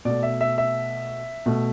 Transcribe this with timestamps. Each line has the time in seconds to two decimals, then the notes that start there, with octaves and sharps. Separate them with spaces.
0.05 B2 A3 D5
0.23 E5
0.41 E5
0.58 E5
1.46 B2 A3